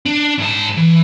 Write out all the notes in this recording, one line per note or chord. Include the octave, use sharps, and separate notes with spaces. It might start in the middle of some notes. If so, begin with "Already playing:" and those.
D4
G#2 A5
E3